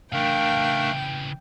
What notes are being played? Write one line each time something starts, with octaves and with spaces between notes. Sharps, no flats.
C#3 E3 A3 D4 A#4 F5 G5